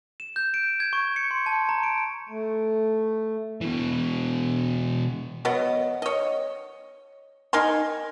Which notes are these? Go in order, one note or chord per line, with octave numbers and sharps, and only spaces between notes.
E7
G6
D7
G#6
C#6
C#7
C6
A5
A#5
D7
A3
B2 E3
F#3 B3 D#5
C#5 D#5
D#4 A#4 G#5 C6